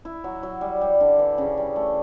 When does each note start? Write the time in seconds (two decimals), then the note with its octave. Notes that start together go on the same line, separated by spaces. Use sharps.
0.05 E4
0.24 F#3
0.43 F#3
0.61 G3
0.81 G3
1.00 D3
1.19 E3
1.38 C#3
1.57 G3
1.76 A3